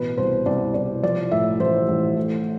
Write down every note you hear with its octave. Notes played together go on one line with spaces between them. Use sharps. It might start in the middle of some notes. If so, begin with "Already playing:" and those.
Already playing: A1 B2 B4
C2 C5
C2 D5
C2 D5
F3 D5
A2 E5
A1 C5
A1
A3